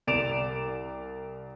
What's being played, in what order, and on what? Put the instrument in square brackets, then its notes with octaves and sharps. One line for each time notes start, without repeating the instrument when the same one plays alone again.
[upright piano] C2 D5 D7 E7 F7